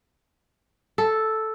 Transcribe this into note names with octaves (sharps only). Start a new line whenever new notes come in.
A4